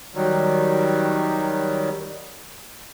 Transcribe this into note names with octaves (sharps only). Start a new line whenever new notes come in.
D#3 F#3 G3